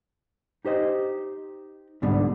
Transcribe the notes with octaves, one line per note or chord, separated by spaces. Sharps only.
D#4 G4 C5 D#5
C2 G#2 D3 G3 B3